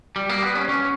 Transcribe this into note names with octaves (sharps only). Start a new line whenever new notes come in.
G3
A#3
B3
C#4
C#4